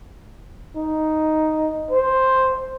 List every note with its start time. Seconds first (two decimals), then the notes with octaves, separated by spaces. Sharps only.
0.76 D#4
1.91 C5